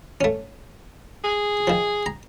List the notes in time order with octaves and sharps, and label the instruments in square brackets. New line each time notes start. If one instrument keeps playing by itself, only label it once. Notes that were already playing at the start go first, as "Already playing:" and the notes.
[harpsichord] A3 C#4
[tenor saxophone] G#4
[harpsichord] D#3 F3
A#5